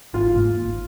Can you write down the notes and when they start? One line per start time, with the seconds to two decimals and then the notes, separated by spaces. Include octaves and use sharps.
0.13 G#1 F4
0.34 G#2 G3 A#3
0.56 G#1